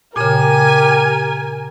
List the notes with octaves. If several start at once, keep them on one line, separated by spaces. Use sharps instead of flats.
A#2 C#3 G4 A#4 G#5